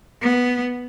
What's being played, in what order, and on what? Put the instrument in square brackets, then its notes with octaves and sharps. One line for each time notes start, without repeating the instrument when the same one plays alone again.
[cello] B3